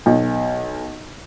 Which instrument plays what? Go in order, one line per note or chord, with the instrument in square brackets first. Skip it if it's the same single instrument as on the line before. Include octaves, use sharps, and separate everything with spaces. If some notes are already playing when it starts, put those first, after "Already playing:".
[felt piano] B1